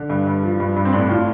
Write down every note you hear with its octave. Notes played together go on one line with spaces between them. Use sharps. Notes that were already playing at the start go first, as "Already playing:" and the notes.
Already playing: D3
G2
G2
F3
G2
G2
C4
A2 D4
A2 F4